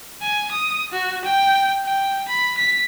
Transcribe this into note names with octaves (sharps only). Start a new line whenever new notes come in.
G#5
D#6
F#4
G5
G5
B5
B6